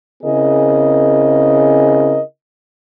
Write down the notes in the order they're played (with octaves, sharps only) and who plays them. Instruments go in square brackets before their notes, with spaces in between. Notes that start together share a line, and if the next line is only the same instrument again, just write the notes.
[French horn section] C#3 C4 E4 G#4 A#4 D#5